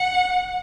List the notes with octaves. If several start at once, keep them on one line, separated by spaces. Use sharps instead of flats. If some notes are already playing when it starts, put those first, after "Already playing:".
Already playing: F#5